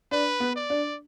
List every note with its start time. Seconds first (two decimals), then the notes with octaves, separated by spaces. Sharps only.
0.11 D4 B4
0.40 B3
0.56 D5
0.70 D4